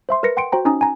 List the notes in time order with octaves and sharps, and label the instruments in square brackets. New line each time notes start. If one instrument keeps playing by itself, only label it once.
[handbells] C5 E5 C6
A#4 B4 A#6 C#7
F#5 G5 C6 C#7 D7
F#4 C5 G5 A#5
C#4 D#4 G#5 A#5 D#6
G#5 A#5